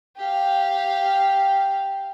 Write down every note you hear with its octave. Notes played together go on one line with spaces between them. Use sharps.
G4 F5